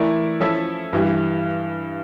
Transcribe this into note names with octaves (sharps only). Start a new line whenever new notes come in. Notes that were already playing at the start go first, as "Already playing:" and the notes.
Already playing: E3 A3 E4 A#4 D5
F3 C#4 E4 A4 E5
G2 E3 G3